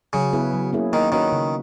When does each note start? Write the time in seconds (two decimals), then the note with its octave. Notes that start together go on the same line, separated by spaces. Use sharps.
0.13 C#3 F#3
0.33 B3 E4 G#4 B4
0.53 F#3
0.73 A#3 C#4 E4 G#4
0.93 D#3 A#3
1.12 D#3 C#4 F#4 B4
1.32 C#3